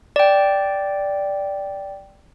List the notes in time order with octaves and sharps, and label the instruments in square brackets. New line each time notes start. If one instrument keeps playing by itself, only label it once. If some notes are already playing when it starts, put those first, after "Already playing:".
[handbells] D5 G5